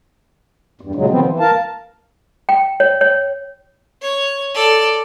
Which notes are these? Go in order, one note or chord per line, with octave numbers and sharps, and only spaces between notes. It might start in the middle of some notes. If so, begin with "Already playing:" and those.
E2 G2
A#2 C#3 F#3 G#3
C3 D#3 F3 B3 C4
E3
A#4 F5 A5
G5
C#5
C#5
C#5
A4 D5